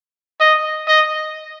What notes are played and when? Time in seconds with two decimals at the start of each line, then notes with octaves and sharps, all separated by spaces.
0.40 D#5
0.87 D#5